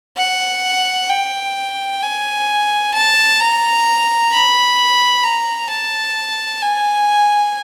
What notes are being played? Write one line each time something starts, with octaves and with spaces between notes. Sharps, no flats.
F#5
G5
G#5
A5
A#5
B5
A#5
A5
G#5